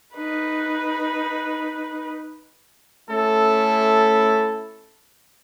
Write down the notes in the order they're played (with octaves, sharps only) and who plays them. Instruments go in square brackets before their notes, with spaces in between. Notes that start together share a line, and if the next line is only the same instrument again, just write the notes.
[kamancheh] D#4 B4
[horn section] A3 C#4 E4 A4